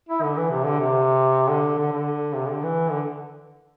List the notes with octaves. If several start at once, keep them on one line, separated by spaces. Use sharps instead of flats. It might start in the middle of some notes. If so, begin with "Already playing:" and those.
E4
D3
E3
C3
D3
C3
D3
D3
D3
C3
D3
E3
D3